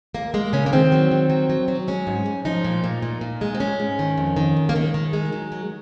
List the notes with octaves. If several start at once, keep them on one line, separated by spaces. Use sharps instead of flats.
D#2 A#3
G#3 A#3
C#3 C#4
A#3
D#3 C4
F#3
D#3
F#3
F#3
F#3
G#3 C#4
G#2
G#2
F3 D#4
A#2
A#2
A#2
A#2
G#3
C4
G#2 C#4
G#2
D#3
F2
D#3
F2
A#3
D#3 G#3
D#3
G#3
F#3
F#3